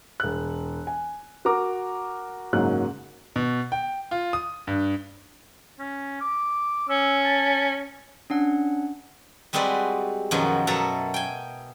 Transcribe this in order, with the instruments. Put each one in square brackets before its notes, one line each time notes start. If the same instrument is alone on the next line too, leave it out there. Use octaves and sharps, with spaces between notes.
[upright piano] E1 F#6
G#5
F#4 A#4 A#5 D6
F#1 G#2 F#3 A#3 F#6
[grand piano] B2
G5
F4
D#6
G2
[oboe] C#4
D6
[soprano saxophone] C#4 [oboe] E6
[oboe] A5
[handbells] C#4 D4 F#5
[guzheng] G3 G#3 C4 F#4 B4 D5
F#2 B2 D#3 F3 F#3
B2 F#3 A4 E5 A5 A#5
G5 G#5